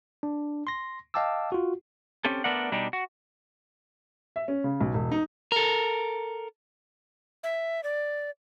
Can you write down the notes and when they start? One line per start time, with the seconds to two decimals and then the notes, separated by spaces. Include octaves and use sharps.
0.23 D4
0.67 C6 A#6
1.14 D#5 F5 G5 A5 D6 E6
1.52 F4 F#4
2.25 C4 C#4 G4 A4
2.44 A3 B3 D4 A#4 D5 F#5
2.72 B2 G3 D4 D#4 G4
2.93 F#4
4.36 E5
4.48 C#4
4.64 C#3
4.81 B1
4.94 E1
5.12 D#4
5.52 A4 A#4
7.43 E5
7.83 D5